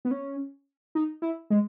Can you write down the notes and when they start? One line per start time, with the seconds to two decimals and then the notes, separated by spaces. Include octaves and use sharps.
0.05 B3
0.11 C#4
0.95 D#4
1.22 E4
1.50 G#3